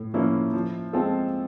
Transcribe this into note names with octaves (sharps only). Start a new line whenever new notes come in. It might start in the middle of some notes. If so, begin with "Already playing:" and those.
Already playing: A2
F3 A#3 C#4 E4
F3
G#3 C4 F4 A4